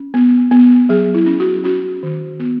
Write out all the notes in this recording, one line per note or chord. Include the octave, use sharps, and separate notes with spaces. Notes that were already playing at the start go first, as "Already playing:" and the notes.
Already playing: C#4
B3
B3
F#3 G#4
E4
C#4
F#4
C#4 F#4
D#3
B3